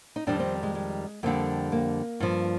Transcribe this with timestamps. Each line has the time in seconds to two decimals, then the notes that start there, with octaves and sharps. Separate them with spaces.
0.16 D#4
0.27 F2 D#3 G3 D4
0.39 C4
0.63 G#3
0.75 G#3
1.23 F2 D3 G3 A#3
1.72 A#3
2.20 G2 F3